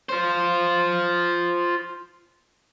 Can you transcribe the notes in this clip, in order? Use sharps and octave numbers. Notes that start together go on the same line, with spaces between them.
F4 C5